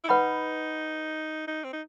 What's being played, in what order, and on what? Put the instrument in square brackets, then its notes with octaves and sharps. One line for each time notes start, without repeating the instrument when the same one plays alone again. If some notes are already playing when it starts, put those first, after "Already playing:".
[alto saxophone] E4
[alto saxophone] D#4 [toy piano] B4 F#5 B5
[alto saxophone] D#4
C4
D#4